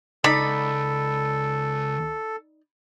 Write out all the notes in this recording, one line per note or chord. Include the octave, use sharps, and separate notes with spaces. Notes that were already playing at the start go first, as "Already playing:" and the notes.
C#2 D#4 A4 D5 B5